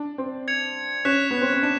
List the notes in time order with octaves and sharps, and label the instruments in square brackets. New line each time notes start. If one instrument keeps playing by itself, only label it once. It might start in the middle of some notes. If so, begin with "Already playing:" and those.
Already playing: [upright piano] D4
C4
[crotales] G#6 C#7 F7
[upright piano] C#4 [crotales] F#6 B6 E7
[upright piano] B3
C4
C#4
[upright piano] D4 [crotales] E7